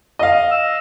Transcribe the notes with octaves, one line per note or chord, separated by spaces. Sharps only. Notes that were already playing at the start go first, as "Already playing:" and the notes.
D#5 F5
E6